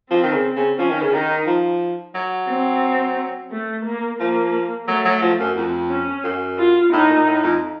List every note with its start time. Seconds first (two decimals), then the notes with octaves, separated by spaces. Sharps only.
0.11 F3 C4
0.23 D#3
0.33 C#3
0.56 C#3
0.78 F3 C#4
0.90 D#3
1.02 C#3
1.13 D#3 D#4
1.47 F3
2.15 F#3
2.49 C4
3.52 A3
3.85 A#3
4.20 F3 A#3
4.87 F#3 A3
5.05 F#3
5.22 F3
5.39 F#2
5.56 F2
5.90 C#4
6.24 F#2
6.58 F4
6.93 A2 D#4
7.10 A#2
7.27 A2
7.43 F2